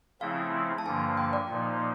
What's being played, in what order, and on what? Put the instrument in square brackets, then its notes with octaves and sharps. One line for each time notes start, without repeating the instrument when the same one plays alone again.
[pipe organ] C#3 F3 A3 C4 E4 [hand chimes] F5
[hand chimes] A5
[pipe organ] G2 D3 F3 A#3 [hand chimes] G#5
[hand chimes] G5
D5
[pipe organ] A#2 F3 A#3 D#4